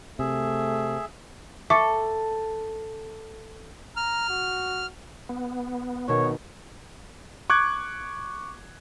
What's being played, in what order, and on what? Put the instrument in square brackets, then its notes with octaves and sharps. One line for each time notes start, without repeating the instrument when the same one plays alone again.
[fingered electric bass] C3 [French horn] A3 [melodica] G#4 E5
[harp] A4 [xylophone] E5 C#6 D6
[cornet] A#5 [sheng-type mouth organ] F6
[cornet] F#4
[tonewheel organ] B3
[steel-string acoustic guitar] B2 D#3 [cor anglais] C#5
[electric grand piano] C#6 D6 F#6 G#6